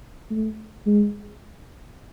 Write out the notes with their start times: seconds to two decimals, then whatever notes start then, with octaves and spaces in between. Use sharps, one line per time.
0.31 A3
0.86 G#3